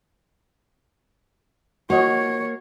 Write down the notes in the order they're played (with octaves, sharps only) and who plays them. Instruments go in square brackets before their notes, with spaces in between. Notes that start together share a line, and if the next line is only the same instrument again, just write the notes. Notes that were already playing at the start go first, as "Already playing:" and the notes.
[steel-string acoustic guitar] A#3 [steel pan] F#4 D#5 [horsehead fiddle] C#5